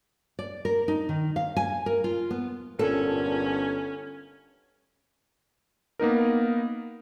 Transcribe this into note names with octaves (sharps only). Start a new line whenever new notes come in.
D5
A#4
D#4
D#3
F5
G#5
A#4
F4
B3
G1 A#2 C#4 A4
A#3 B3 D#4 A#4